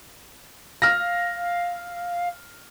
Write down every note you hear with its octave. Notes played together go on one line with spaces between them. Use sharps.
F5 F6 A#6